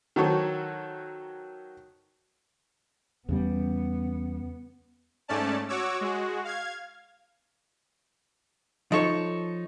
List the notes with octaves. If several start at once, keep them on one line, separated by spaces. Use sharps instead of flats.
D#3 F#3 F#4 A4 C5 C#5
E2 C#3 G3 B3
G#2 A3 C#4 D5 A5
F#4 C#5 D6 E6
G#3 F#4
F5 G#6
F3 D#4 A4 C#5 C#6